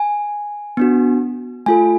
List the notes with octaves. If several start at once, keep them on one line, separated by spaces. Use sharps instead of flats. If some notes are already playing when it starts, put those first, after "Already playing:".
Already playing: G#5
B3 D4 F#4
A3 F4 A4 G#5